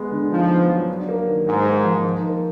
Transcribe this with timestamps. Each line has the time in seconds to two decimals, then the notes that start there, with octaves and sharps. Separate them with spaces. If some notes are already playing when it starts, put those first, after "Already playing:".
Already playing: G#3 B3
0.11 D3
0.30 F3 D#4
0.49 B3
0.70 F#3
0.88 D4
1.09 A#3
1.28 D#3
1.46 G#2 D#4
1.66 A#3
1.85 F3
2.05 D#4
2.24 A#3